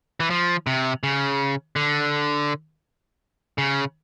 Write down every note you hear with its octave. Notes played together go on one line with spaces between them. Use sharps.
E3
F3
C3
C#3
D3
C#3